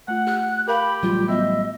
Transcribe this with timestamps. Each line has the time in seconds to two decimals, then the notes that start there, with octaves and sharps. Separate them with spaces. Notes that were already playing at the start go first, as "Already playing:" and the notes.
0.08 A3 F4 F#5
0.27 G4 F#6
0.68 G4 A#4 F5 B5
1.03 A1 F#3 G3 F4
1.28 B3 F4 D#5 E5